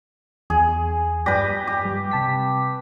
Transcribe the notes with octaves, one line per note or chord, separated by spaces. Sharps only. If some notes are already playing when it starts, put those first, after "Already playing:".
E2 G#4
G2 G4 B4 D5 A#6
G4
G3
C3 A5 B6